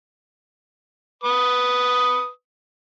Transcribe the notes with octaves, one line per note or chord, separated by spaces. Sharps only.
B4 D#6